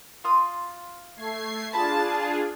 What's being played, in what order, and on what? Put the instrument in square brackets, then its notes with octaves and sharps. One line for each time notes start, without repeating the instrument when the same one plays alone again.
[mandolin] F4 C6 D#6
[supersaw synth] A3 G#6 C7
[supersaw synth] D4 F4 G#4 [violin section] A5 [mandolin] B5